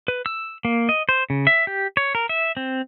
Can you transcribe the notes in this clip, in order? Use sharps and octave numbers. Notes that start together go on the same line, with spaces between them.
B4
E6
A#3
D#5
C5
C#3
E5
G4
C#5
A#4
E5
C4